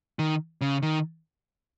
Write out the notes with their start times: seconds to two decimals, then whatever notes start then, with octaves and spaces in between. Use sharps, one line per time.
0.19 D#3
0.61 C#3
0.82 D#3